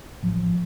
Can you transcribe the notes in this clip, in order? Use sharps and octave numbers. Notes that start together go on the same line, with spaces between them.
A1 F3